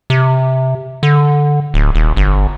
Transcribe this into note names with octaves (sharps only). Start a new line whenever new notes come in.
C3
D3
D1
D#1
G1